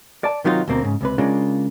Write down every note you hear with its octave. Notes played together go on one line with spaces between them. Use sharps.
D5 A5
C3 D#3 F#3 D#4 F4
D2 B2 A#3 C4
G#2 C#3
C#2 C3 B4
C#3 G#3 A#3 D4 F4